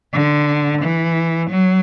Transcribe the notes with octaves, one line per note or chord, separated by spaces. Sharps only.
D3
E3
F#3